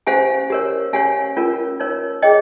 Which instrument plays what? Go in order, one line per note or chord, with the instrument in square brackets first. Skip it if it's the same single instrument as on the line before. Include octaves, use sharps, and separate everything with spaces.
[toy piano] C#4 G4 C5 F5 G#5
G4 A#4 C#5
C#4 G4 C#5 F5 G#5
C#4 F4 A#4
D#4 A#4 C#5
G#4 C#5 D#5 G5